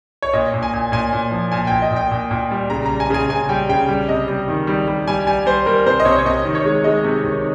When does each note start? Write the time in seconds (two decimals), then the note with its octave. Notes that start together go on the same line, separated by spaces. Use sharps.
0.22 C#5
0.33 A#2 D#5
0.54 A#2
0.63 G#5
0.73 A#2
0.92 A#2 G#5
1.13 A#2
1.31 F3
1.52 A#2 G#5
1.67 G5
1.71 A#2
1.82 D#5
1.91 A#2
1.96 G5
2.11 A#2
2.31 A#2
2.51 G3
2.70 C#3 A#5
2.86 A#5
2.89 G3
3.00 G#5
3.10 C#3 G#5
3.30 C#3 G#5
3.49 G3 G5
3.69 C#3 G5
3.89 G3
4.09 C3 D#5
4.28 G3
4.48 D#3
4.67 G3
4.88 G3
5.07 G3 G#5
5.27 G3 G#5
5.46 G3 C5
5.66 G3 A#4
5.86 C3 C5
6.00 D#5
6.05 C3 C#5
6.18 C#5
6.26 C3 D#5
6.45 D#3
6.55 C#5
6.65 G#3
6.84 G#3 D#5
7.04 C3
7.24 D#3